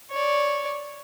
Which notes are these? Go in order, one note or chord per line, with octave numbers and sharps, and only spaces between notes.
C#5 D5